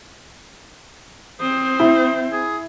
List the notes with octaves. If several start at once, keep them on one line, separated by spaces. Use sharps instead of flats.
C4 C5 D#6
E4
G#4